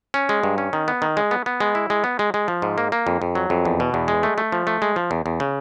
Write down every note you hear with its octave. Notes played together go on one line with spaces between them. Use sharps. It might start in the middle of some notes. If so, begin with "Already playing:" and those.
C#4
G#3
G2
C#4
D#3
B3
D#3
G#3
B3
B3
G#3
E4
G#3
B3
G#3
G#3
F3
G#2
A#3
A#3
F2
F2
F#3
F2
E2
B2
E2
G#3
A3
A3
F3
A3
G#3
F3
E2
E2
C#3